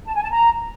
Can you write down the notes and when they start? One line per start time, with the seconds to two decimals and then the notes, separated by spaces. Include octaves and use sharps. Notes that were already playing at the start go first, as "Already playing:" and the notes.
0.06 A5
0.14 G#5
0.23 A5
0.31 A#5